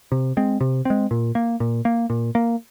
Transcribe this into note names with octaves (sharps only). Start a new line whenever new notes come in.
C3
G#3 C4
C3
G#3 C4
A#2
A#3
A#2
A#3
A#2
A#3